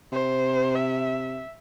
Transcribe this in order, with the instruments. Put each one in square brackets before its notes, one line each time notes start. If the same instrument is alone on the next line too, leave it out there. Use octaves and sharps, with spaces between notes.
[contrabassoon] C3 [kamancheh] C5
[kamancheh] E5